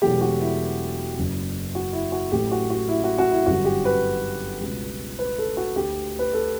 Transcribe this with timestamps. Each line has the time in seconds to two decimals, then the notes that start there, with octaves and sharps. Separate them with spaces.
0.02 E1 E2 B2 F#3 A3 G4
0.21 F#4
0.41 E4
1.16 F#1 F#2 C#3
1.75 F#4
1.93 E4
2.12 F#4
2.32 A1 A2 F#3 A3 G4
2.52 F#4
2.70 F#4
2.89 E4
3.04 F#4
3.18 F#4
3.32 E4
3.46 G1 F#2 D3 G3 F#4
3.65 G4
3.85 B4
4.61 C#2 B2 G3
5.19 B4
5.38 A4
5.57 F#4
5.76 D2 D3 A3 G4
6.19 B4
6.33 A4